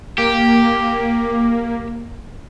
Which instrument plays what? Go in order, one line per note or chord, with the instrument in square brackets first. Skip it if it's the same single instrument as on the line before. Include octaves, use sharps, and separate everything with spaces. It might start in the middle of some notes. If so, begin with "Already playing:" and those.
[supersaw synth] A#3 [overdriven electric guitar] G4